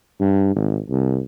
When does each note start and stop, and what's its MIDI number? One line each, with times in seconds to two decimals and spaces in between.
0.20 0.52 43
0.56 0.78 32
0.90 1.20 36